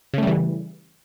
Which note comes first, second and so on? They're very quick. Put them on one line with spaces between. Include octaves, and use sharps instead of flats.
C#3 A3 G3 E3